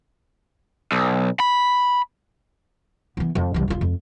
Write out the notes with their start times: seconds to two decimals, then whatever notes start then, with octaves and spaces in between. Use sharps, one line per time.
0.92 B1
1.40 B5
3.17 E3 B3
3.35 F2
3.54 C2 E3
3.68 D#1 F4
3.81 F2